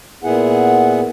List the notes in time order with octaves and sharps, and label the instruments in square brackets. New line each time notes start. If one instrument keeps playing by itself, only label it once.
[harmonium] A#2 B3 E4 G#4 F#5